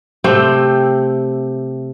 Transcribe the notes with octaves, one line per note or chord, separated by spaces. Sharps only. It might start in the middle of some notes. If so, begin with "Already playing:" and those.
C3 A3 C4 G5